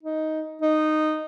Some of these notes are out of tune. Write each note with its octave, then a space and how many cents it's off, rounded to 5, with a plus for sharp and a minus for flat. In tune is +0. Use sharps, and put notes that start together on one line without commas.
D#4 +10
D#4 -10